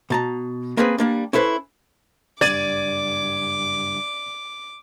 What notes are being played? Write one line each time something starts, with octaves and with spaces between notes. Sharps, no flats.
B2 A5 A#5
A#3 C4 C#4 G#4 B4
G3 A#3 D4
C#4 E4 A4 B4 C5
F#1 G2 D5 D6 G#6 D#7